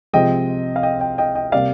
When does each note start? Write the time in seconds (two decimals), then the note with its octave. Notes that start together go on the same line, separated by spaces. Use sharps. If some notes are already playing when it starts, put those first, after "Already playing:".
0.13 C3 F3 G#3 C4 D#5 G5
0.76 F5
0.83 D#5 G5
1.00 D#5 G5
1.18 D#5 G5
1.35 D#5 G5
1.52 C3 G3 A#3 D5 F5